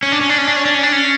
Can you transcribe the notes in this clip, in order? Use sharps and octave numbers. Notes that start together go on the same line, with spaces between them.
C#4
D4
C#4
D4
C#4
D4
C#4
D4
C#4
D4
C#4